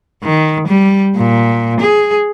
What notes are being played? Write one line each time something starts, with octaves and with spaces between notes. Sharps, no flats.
D#3
G3
A#2
G#4